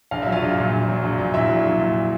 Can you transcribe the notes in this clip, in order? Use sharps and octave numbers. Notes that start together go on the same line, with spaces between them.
A#1 F5
F#3 E5
F4 F5
A#1
A#2
A#1
F#3
A#1
A#2
A#1 E4 E5
F#3
A#1
A#2